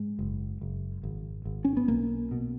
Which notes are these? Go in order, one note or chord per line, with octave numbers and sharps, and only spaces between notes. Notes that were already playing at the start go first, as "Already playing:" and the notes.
Already playing: G#2 G#3
F#1
F#1
G#1
G#1
C#4
B3
B1 A#3
B2